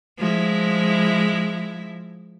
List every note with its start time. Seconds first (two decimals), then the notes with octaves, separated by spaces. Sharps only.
0.18 F3 G#3 E4